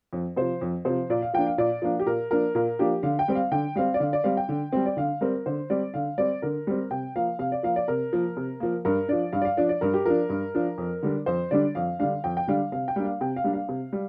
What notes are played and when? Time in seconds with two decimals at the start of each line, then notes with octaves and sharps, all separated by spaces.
0.13 F2
0.36 C3 F3 C5
0.61 F2
0.85 C3 F3 C5
1.10 A#2 D5
1.22 F5
1.33 F3 A#3 D4 G5
1.46 F5
1.58 A#2 D5
1.82 F3 A#3 D4
1.99 G4
2.06 A#2 A#4
2.31 F3 A#3 D4 A#4
2.55 A#2 A#4
2.79 F3 A#3 D4 G4
3.03 D3 F5
3.19 G5
3.28 G3 C4
3.35 F5
3.52 D3 G5
3.76 G3 C4 F5
3.94 D5
4.00 D3 F5
4.13 D5
4.24 G3 C4 F5
4.37 G5
4.49 D3
4.72 G3 C4
4.86 D5
4.97 D3 F5
5.21 G3 C4 A#4
5.46 D3 C5
5.70 G3 C4 D5
5.94 D3 F5
6.18 G3 C4 D5
6.42 D3 A#4
6.67 G3 C4
6.91 C3 G5
7.16 F3 A#3 F5
7.39 C3 F5
7.52 D5
7.63 F3 A#3 F5
7.76 D5
7.88 C3 A#4
8.13 F3 A#3
8.37 C3
8.60 F3 A#3
8.85 G2 A#4
9.08 F3 D4 D5
9.32 G2 F5
9.42 D5
9.45 F5
9.57 F3 D4 D5
9.69 D5
9.81 G2 A#4
9.94 G4
10.06 F3 D4 A#4
10.29 G2
10.55 F3 D4
10.78 F2
11.03 D3 G3 D4
11.26 F2 C5
11.51 D3 G3 D4 D5
11.75 F2 F5
11.99 D3 G3 D4 F5
12.24 F2 G5
12.37 G5
12.47 D3 G3 D4 F5
12.72 C3 F5
12.88 G5
12.96 G3 A#3 D4
13.05 F5
13.21 C3 G5
13.36 F5
13.44 G3 A#3 D4
13.53 F5
13.69 C3
13.93 G3